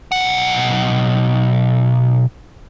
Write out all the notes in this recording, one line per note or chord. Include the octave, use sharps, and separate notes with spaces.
B1 F#5